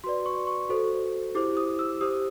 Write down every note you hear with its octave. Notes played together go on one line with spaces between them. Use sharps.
F#4 B4 D5 C6
C#6
C#6
F#4 A4 C5
E4 G4 C5 D6
D#6
E6
G4 C5 D#6